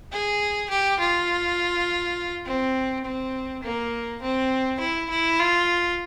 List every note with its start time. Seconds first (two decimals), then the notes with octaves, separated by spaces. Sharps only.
0.12 G#4
0.70 G4
0.99 F4
2.45 C4
3.04 C4
3.63 A#3
4.22 C4
4.80 E4
5.10 E4
5.39 F4